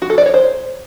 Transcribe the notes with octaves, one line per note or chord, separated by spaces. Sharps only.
F#4
A4
D5
C#5
C5